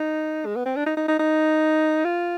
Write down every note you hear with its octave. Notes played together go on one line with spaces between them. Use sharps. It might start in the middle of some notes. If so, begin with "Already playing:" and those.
Already playing: D#4
G#3
B3
C4
D4
D#4
D#4
D#4
D#4
F4